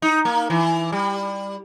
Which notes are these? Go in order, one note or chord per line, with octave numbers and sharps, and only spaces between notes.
D#4
A#3
E3
G3